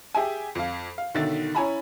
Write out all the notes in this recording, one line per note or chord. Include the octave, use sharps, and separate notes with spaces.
G4 G#4 E5 G#5
F2 F5
F5
B1 D3 D#3 E5 A6
C#4 E4 C#5 G#5 A#5 B5